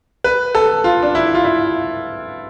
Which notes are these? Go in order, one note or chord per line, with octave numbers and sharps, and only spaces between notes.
B4
A4
F4
D4
E4
F4
E4